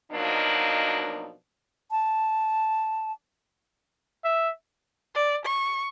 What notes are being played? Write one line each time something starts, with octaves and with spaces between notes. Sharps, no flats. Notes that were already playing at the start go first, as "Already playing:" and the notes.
B2 F3 F#3 A#3 D4 D#4
A5
E5
D5
C#6